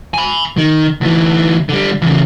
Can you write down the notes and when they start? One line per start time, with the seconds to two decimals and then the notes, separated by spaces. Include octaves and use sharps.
0.14 G#5 B5
0.58 D#3
1.01 D2 E3
1.69 D3 G3
2.02 E2 C#3